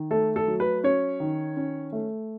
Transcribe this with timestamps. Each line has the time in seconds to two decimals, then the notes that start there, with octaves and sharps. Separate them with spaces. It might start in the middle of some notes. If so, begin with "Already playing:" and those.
Already playing: D#3
0.11 A3 A4
0.36 A4
0.48 F#3
0.60 B4
0.84 C#4 C#5
1.20 D#3
1.57 C#4
1.93 A3